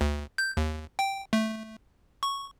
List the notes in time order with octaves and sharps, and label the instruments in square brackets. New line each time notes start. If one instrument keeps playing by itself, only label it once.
[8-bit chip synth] D2
G6
D#2
G5
A3
C#6